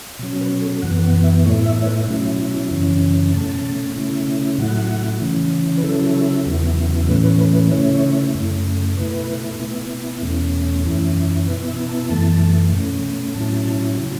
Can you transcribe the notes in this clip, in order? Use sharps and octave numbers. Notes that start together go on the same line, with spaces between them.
B2 F#3 C#4
B4
A4
F#2 E3 B3 F#5
F#5
E5
A2 A3 E4 C#5
E5
C#5
B4
B2 F#3 C#4 E4
F#2 C#3 E3 C#4
B2 A3 C#4 A5
C#3 A3 C#4 E4
A2 F#3 A3 E4 F#5
C#3 E3 C#4
B4
C#3 F#3 C#4 E4 A4
E2 C#3 F#3 B3 E4
A2 E3 A3 C#4 B4
B4
B4
B4
C#3 A3 C#4 E4 C#5
F#2 C#3 A3
B2 A3 E4 B4
B2 B3 E4
E2 B2 A3 C#4
F#2 E3 C#4 E4
B2 B3 E4 B4
E5
A5
F#2 E3 A3 A5
B2 A3 C#4
A2 F#3 C#4 E4 A5
C#3 F#3